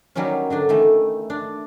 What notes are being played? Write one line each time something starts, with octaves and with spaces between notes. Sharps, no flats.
D#3 F#3 G3 A#3 C#4
D3 F#3 D4
D#3 E3 A3
D4